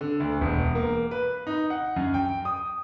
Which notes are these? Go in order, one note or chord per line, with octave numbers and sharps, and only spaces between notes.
D3
D2
E1
A#3
B4
D#4
F#5
F#2
G5
D#6